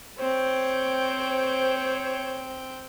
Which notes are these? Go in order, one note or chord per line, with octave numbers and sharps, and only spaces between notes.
C4 C5 C#5 G5